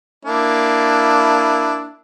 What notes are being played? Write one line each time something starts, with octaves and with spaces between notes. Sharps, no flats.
A#3 D4 E4